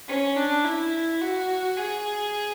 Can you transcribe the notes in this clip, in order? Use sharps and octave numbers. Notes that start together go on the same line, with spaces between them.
C#4
D4
E4
F#4
G#4